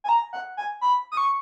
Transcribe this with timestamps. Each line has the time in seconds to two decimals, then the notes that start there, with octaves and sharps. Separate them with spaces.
0.04 G#5
0.09 A#5
0.33 F#5
0.57 G#5
0.81 B5
1.12 D#6
1.17 C#6